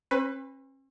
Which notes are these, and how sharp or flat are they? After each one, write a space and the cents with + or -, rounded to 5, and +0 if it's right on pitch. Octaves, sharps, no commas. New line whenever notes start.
C#4 -45 B4 +15